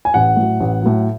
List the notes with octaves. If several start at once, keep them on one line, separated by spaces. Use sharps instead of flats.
G#5
A1 F#5
A2 F#3
A1
A2 F#3